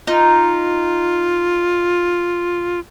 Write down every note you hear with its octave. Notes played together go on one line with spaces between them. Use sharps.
D#4 F4